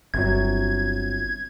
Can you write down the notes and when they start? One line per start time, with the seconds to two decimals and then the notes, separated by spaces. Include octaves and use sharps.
0.14 G1 C3 F#3 G#6